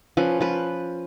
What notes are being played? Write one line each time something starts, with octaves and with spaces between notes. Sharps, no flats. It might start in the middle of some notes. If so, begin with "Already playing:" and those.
F3 C#4 B4
F3 B4